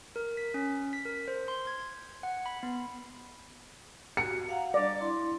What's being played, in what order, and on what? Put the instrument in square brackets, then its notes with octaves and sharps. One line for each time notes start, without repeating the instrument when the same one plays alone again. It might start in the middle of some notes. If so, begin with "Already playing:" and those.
[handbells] A#4
B6
C#4
B6
A#4
C5
C6
G#6
F#5
B5
B3
[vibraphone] F#4 G4 [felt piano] C#7
[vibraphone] F5 F#5 A#5
[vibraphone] G3 D4 [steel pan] D5
[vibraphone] E4 C6